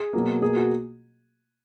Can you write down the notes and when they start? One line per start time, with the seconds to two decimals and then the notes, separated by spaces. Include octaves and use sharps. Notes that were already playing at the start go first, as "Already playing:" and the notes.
Already playing: G#4
0.13 B2 F#3 A#3
0.42 B2 A#3 G#4
0.56 F#4